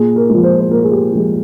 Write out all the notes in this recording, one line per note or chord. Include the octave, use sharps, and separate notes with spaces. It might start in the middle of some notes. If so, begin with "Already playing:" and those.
Already playing: A#2 G#4
A#4
F3 G#3
C5
C5
A#2 A#4
G#4
G4
F3 G#3 G#4